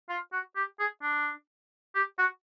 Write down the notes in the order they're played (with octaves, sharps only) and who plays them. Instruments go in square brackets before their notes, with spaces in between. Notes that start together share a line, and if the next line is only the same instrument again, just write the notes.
[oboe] F4
F#4
G4
G#4
D4
G4
F#4